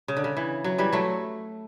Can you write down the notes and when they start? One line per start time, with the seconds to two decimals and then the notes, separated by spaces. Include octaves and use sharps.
0.08 C#3
0.17 D3
0.24 C#3
0.37 E3
0.64 F#3
0.78 E3 G3
0.93 F#3 A3